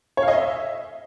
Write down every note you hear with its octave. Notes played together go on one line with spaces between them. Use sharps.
C#5
F5
D#5
E5